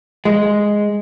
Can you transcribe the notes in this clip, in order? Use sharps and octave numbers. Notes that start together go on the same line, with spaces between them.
G#3